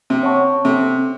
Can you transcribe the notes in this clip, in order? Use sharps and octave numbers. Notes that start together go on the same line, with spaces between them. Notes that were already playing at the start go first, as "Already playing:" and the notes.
C3
C#5 F#5 A5 C#6
C3 A4